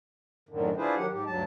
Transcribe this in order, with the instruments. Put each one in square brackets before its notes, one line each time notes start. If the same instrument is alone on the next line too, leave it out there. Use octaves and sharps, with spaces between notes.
[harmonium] F#2 A2 D3 D#3
D4 E4 F4 G#4 B4 C5
D#3 F#3 G4 F#5
G#2 G4
D2 G2 F#3 A5